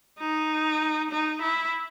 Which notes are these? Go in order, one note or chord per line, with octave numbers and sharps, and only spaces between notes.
D#4
D#4
E4